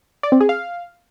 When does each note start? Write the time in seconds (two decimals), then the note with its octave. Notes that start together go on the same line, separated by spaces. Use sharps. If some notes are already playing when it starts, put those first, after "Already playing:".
0.23 D5
0.32 C4
0.41 G#4
0.49 F5